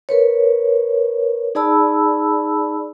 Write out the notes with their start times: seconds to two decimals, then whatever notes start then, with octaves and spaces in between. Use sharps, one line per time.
0.09 A#4 B4 C#5
1.55 D#4 G#4 D5 A5 B5 E6